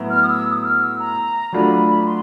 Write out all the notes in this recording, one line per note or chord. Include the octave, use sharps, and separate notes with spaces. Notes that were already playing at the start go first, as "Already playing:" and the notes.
Already playing: A2 F#3 B3 E4
F6
D#6
E6
D#6
E6
F6
E6
A#5
F#3 A3 D4 F4 B5
C6